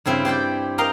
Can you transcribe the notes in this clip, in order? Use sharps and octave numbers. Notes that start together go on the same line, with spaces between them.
G2 C#3 C4 E4
G4 C5 D5 G5
A#4 D#5 F5 G5